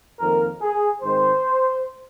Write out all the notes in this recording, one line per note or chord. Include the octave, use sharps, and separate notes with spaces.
F2 D#3 A#3 A#4
G#4
G#2 D#3 G#3 C4 C5